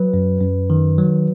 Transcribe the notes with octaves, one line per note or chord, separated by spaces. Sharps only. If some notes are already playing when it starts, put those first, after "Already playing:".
Already playing: F#3 B4
F#2
F#2
D#3
F#3